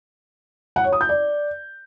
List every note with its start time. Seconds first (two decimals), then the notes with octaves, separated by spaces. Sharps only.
0.76 F#5
0.84 C#5
0.93 D#6
1.01 G6
1.09 D5